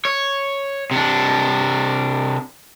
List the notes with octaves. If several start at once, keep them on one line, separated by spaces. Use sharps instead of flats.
C#5
C3 D4